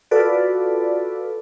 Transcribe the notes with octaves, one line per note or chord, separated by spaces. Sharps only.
F4 F#4 A4 B4 D5